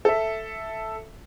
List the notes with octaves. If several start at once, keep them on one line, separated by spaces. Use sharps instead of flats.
A4 E5